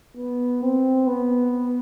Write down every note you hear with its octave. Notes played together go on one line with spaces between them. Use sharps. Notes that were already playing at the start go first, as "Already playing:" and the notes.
B3
C4
B3